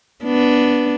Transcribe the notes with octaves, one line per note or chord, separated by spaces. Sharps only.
B3 D4